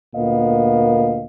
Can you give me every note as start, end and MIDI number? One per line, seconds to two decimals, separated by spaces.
0.15 1.25 38
0.15 1.25 46
0.15 1.25 59
0.15 1.25 70
0.15 1.25 75
0.15 1.25 77